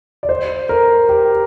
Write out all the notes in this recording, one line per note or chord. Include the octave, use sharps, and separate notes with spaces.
D5
C5
A#4
G4